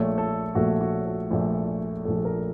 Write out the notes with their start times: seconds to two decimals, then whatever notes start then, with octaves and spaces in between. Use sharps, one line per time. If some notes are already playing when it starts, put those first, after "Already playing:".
Already playing: A#1 A#2 A3 C#5
0.18 A4
0.55 A#1 A#2 A3 F#4
0.81 F#4
1.06 A4
1.31 A#1 A#2 A3
2.05 A#1 A#2 A3 A4
2.25 A#4